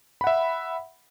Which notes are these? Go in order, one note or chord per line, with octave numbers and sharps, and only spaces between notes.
E5 F#5 B5